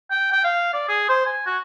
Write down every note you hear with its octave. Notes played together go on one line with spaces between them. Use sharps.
G5
G5
F5
D5
G#4
C5
G#5
F#4